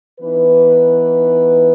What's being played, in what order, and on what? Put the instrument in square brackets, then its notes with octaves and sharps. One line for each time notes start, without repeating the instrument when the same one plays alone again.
[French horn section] E3 B3 D#4 B4